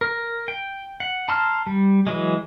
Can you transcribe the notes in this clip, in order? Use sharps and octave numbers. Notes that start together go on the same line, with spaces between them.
A#4
G5
F#5
A5 A#5 C6 E6 F6
G3
E3 F#3 G#3